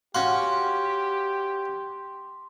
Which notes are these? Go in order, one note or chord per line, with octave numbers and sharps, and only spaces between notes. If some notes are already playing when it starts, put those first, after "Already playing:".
C#4 F#4 G4 F5 C6